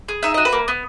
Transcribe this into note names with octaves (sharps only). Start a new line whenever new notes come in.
G#4
D#4 E5
F#4 D#5
B4
A#3
B3